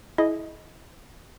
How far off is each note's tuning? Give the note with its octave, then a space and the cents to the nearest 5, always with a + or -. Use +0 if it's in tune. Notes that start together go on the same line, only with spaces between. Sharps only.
E4 -15 G#4 +35 D#5 +0